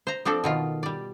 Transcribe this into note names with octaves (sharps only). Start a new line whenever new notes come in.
C5 A#5
F3 C4 D4 A4 D5
B2 D#3 F4
G3 D5